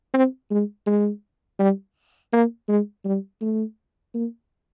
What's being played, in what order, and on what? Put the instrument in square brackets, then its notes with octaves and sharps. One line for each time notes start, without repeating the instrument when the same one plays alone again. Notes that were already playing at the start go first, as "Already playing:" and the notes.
[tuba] C4
G#3
G#3
G3
A#3
G#3
G3
A3
A#3